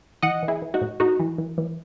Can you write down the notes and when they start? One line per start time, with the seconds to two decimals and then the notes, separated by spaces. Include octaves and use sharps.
0.22 E3 D#5 F#5
0.43 E3
0.48 E4 G#4
0.62 E3
0.74 D#4 F#4
0.81 A2
1.00 A2 D#4 F#4
1.20 E3
1.38 E3
1.58 E3